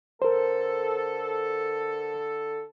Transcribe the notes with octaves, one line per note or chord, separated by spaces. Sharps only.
D3 A4 A#4 C5